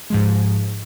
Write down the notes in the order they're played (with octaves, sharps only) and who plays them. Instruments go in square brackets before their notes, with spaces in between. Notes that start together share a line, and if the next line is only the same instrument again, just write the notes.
[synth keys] G#2 F3 G#3